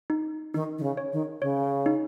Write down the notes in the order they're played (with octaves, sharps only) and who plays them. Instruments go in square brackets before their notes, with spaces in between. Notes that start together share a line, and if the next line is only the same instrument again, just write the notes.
[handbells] D#4
[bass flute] D#3 [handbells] D#4
[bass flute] D#3
C#3
[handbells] C#5
[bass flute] D#3
[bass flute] C#3 [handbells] C#5
[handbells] D#4